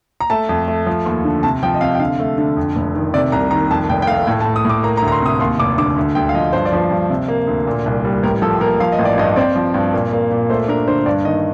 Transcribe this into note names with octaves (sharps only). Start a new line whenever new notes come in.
A#5
A3 A5
F2
A3
F3
D#2
D3
C3 A5
F3 G5
D#5
C3 F5
G5
D3 F5
A3
D3
F2
F1
D#3
C3 D5
C2 A#5
D#3 A#5
F2 A5
F1 G5
G5
A3 F5
A2 G5
A5
A2
D#6
A2 D6
A#3 A#5
A#5
D2
A#5
C6
C3 D#6
D#2 C6
F1 D6
D3 D6
D2
D2 G5
F5
F3 D#5
G2 C5
D5
F3 C5
G2
C3
A#3
D2
A#2
C2
G3
A1 A#4
F3 A4
A#3 A#4
F3 F5
D#5
A1
D5
G2 D#5
C4 D5
F3
G2
A#2
A#3
A#2
A3 C5
D4 A#4
D3 C5
G2 D5
D#3 D#5